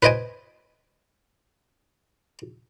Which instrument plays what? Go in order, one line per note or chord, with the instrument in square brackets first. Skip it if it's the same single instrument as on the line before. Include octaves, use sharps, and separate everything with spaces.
[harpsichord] B4 C5 D#5 G5 G#5